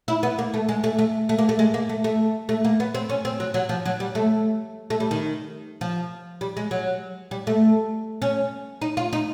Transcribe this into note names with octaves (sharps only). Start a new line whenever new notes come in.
E4
B3
A#3
A3
G#3
A3
A3
A3
A#3
A3
G#3
A#3
A3
A3
A3
A#3
B3
C4
C#4
C4
F#3
F#3
F3
F#3
G3
A3
A3
G3
D#3
F3
G3
G#3
F#3
G3
A3
C#4
D#4
F4
D#4